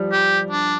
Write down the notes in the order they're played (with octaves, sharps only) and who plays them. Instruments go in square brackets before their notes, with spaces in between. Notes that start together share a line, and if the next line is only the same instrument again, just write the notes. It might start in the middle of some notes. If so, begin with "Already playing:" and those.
Already playing: [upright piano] F3 G3
[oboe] G4
D4